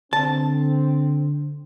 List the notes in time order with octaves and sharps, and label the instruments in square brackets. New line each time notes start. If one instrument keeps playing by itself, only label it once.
[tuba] D3 [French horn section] C4 [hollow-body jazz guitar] A5